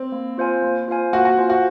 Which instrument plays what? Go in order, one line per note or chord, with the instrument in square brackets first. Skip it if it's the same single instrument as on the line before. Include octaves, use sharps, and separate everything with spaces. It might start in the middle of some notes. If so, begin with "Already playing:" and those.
Already playing: [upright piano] C4
[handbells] A#3
F4 C5 F5 G#5
A#3
F4 C5 F5 G#5
[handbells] A#3 [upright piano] F#4
[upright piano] F#4
[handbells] F4 C5 F5 G#5
[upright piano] F#4